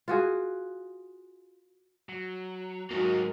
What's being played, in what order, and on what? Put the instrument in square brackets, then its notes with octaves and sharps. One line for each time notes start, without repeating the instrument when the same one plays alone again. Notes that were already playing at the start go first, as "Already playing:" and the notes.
[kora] F4 F#4 G#4
[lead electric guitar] F#3
[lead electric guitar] E2 G#2 [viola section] F#3 A#4 [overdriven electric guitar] A#3 D#4 [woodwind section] F#4